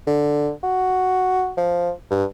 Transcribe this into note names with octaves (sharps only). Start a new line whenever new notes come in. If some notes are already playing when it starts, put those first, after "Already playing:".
D3
F#4
F3
G2